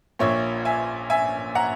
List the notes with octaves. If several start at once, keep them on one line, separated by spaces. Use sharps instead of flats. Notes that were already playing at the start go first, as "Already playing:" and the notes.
A#1 A#2 C#5 E5
E5 G#5
E5 G#5
F#5 A#5